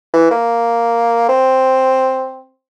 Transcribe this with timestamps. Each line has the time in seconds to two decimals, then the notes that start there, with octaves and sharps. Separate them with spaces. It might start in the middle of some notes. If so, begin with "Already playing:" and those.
0.13 E3
0.31 A#3
1.29 C4